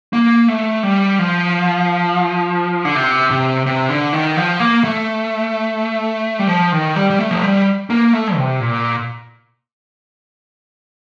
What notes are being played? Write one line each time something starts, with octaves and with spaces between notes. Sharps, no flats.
A#3
A3
G3
F3
D3
C3
C3
C3
D3
D#3
F3
A#3
A3
G3
F3
D#3
G3
G3
A3
F3
G3
A#3
A3
C3
A#2